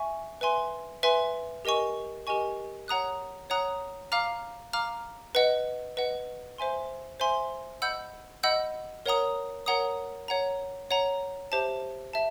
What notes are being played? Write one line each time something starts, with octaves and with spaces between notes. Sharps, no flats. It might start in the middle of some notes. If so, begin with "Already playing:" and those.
Already playing: E5 G#5 C#6
B4 E5 G#5 C6
B4 E5 G#5 C6
G4 A#4 D#5 G#5 C#6
G4 A#4 D#5 G#5 C#6
C#5 F#5 A#5 D#6 F#6
C#5 F#5 A#5 D#6 F#6
F5 A#5 D6 F6
F5 A#5 D6 F6
B4 D#5 F#5
B4 D#5 F#5
C5 E5 G#5 C6
C5 E5 G#5 C6
D#5 F#5 B5 E6 G6
D#5 F#5 B5 E6 G6
A#4 C#5 F#5 A#5 D#6
A#4 C#5 F#5 A#5 D#6
C#5 F#5 A#5
C#5 F#5 A#5
G4 C5 E5 A5
E5 A5